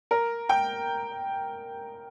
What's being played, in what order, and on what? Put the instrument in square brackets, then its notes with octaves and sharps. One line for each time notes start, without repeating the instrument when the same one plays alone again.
[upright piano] A#4
G5